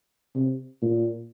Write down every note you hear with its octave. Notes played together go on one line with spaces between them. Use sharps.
C3
A#2